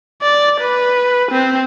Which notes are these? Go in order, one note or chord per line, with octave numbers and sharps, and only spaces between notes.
D5
B4
C4